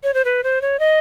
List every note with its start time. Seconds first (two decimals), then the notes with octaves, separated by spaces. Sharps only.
0.03 C#5
0.14 C5
0.25 B4
0.43 C5
0.61 C#5
0.79 D#5